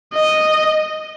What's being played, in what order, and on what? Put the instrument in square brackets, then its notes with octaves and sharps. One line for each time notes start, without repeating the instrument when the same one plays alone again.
[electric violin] D#5